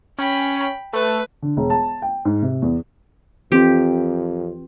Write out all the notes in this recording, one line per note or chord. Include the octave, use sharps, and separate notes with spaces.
C#4 G5 B5
A3 B4
D3
E1
A5
G5
G#2
C3
E2
F2 E3 C4 F4 G4